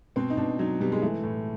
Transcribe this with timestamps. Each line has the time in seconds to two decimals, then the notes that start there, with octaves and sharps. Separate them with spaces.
0.16 B2 C4
0.30 D#4
0.37 B2 D4
0.59 F#3 D#4
0.80 B2 G3
0.92 G#3
1.02 E3 A3
1.24 A2